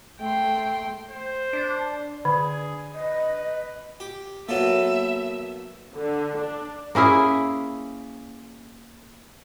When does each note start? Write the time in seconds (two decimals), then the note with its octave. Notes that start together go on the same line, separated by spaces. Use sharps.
0.20 A3 G5 C6
1.11 C5
1.53 D4
2.25 D3 G#4
2.95 B4 D#5
4.00 G4
4.49 F#3 A#3 B3 A4 E5
5.94 D3
6.37 D4
6.95 A#3 C#4 E4 G#4